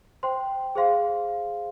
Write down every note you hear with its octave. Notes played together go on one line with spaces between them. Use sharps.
C5 G5 C6
G#4 C5 F5 C6